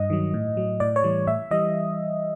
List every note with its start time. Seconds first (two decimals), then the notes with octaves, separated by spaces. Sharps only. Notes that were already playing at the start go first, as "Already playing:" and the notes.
Already playing: G2 D#5
0.10 D#3 F#3
0.34 A2
0.57 F#3
0.80 A2 D5
0.96 C#5
1.04 E3 G3
1.27 A2 E5
1.51 E3 G3 D#5